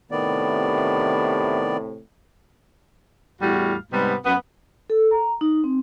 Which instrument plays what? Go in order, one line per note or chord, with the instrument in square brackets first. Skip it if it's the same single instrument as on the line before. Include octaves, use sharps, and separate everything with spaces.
[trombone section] A2 C3 [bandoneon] D#3 B3 D5
[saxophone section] E2 A2 G3 F#4 F5
G#2 C3 G3 B3
F#2 B3
[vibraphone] A4
A#5
D#4
C4